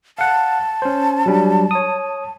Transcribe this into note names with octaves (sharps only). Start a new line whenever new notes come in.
F5 F#5 A5
C#4 C5
F#3 G3 D4
C#5 D#6